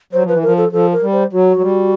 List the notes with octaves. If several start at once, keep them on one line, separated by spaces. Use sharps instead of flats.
F#3 C5
F3
B4
E3
F3 A#4
A4
F3 A4
A#4
G3
C5
F#3 F#4
F#3
G3